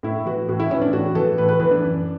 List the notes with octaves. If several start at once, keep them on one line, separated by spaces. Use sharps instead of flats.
A2 E4
E3 F#4
A2 F#4
E4
E3 C#4
D4
A2 F#4
E3 A4
A2 B4
B4
E3 B4
D4
F#2